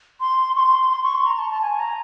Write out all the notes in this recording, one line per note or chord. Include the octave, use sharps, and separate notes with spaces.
C6
C#6
C6
C6
C#6
C6
A#5
A5
A5
G#5
A#5